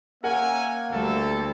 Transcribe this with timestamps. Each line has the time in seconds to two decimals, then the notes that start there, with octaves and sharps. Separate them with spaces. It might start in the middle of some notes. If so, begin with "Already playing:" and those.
0.24 A#3 C#4 A#4 E5 F#5 G#5
0.92 D2 G3 A3 A4